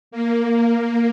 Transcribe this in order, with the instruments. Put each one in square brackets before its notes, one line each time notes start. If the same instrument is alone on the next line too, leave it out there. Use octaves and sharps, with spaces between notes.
[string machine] A#3